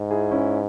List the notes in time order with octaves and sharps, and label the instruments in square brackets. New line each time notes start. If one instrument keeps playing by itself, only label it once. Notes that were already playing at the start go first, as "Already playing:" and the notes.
Already playing: [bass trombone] G#2
[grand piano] E4 G#4
C#4 E4